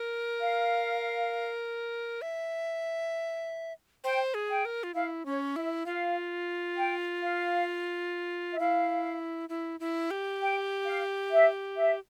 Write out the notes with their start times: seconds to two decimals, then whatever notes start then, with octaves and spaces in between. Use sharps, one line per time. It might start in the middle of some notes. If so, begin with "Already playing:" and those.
Already playing: A#4
0.40 F5
2.22 E5
4.04 C5 G5
4.34 G#4
4.50 G5
4.65 A#4
4.83 F4
4.94 E4 F5
5.25 C#4 C#5
5.56 E4 E5
5.86 F4 F5
6.77 G5
7.22 F5
8.54 E5
8.58 E4 F5
9.49 E4
9.80 E4
10.11 G4
10.41 G5
10.85 F5
11.31 E5
11.77 E5